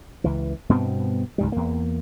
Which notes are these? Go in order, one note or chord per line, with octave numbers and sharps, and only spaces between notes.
C#2 E3
G2 B2 B3 C4
C#2 G#2 G3
E2 A#3